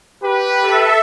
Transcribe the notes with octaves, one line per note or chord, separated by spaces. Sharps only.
G4 B4
A4 E5